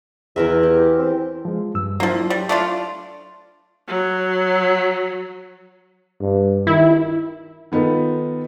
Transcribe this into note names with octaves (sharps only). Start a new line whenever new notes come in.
E2 E3 A#4 E5
G4
C4
F3 G#3
G2 E6
F3 F#3 A#3 D4 E4
G3
A3 D4 F4
F#3
G2
D#3 E4
D#3 B3 D#4 F4 A4